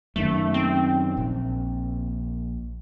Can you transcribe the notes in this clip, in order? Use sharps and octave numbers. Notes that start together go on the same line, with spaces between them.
F#2 D#3 A3
C4
A#1